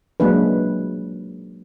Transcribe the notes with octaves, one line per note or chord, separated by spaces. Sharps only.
F#3 G#3 A#3 D4 B4